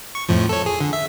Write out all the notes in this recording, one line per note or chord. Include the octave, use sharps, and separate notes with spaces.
C#6
F2 A2 F3
A4 C#5
G#4
D3
E5